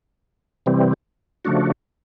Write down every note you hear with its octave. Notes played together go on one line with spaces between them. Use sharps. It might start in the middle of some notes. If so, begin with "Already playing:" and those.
C3 E3 G3 C4
C#3 F3 A3 D4 F#4